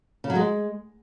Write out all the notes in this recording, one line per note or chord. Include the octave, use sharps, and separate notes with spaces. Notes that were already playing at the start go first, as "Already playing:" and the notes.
C#3
F#3
G#3